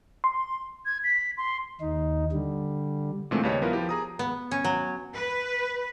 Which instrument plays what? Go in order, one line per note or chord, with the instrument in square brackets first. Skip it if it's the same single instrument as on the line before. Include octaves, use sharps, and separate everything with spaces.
[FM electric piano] C6
[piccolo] G#6
B6
C6
[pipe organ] D#2 D#4
D3 G3
[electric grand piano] A#2 D3 E3 G#3 A3 C4
D#2 C#3 G3 B4 C#5 D#5
F3 B3 E4 F4 A#4 B4
F3 G4
G#4 A#5 D#6
[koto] B3
C#4
F#3
[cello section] B4